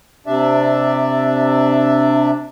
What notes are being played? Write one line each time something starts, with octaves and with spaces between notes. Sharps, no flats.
C3 D4 D5 E5